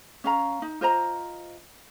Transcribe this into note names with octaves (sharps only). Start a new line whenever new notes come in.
C#4 F5 A#5
D#4
F4 C5 D#5 A#5